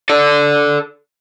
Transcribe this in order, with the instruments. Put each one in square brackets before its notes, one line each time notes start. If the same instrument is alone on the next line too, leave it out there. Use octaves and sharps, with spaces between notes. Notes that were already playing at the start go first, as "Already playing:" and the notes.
[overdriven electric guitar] A4 D5